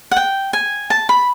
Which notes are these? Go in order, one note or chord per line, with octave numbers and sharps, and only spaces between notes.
F#5
G5
G#5
A5
B5